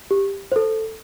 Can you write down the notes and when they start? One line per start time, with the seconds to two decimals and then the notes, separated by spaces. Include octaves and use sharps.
0.11 G4
0.52 C5
0.56 A4